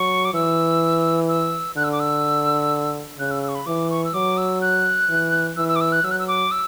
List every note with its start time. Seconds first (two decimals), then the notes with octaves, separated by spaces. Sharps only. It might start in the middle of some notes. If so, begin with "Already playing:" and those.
Already playing: F#3 C#6
0.25 D6
0.34 E3 E6
1.29 E6
1.77 D3 F#6
1.84 E6
1.92 D6
2.00 E6
3.19 C#3 F#6
3.31 E6
3.43 E6
3.49 C#6
3.55 B5
3.66 E3 D6
3.90 C#6
4.05 E6
4.14 F#3 D6
4.37 E6
4.62 F#6
5.09 E3
5.57 E3 E6
5.68 E6
5.76 D6
5.81 E6
5.92 F#6
6.04 F#3 E6
6.11 F#6
6.19 E6
6.28 D6
6.51 E6